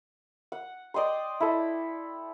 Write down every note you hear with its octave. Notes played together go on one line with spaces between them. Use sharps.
F#5
D5 D#5 G5 C6
E4 A4